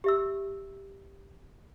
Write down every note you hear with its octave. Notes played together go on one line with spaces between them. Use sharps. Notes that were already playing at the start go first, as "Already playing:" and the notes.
G4 E5 E6